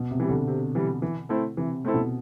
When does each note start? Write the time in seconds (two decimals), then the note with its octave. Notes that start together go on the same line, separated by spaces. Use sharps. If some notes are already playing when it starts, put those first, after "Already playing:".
Already playing: B2
0.11 C3
0.20 E3 G3
0.29 D3
0.48 C3
0.75 E3 G3
1.02 E3
1.29 A3 C4 E4 A4
1.57 C3 E3
1.85 A3 C4 E4 A4
1.94 B2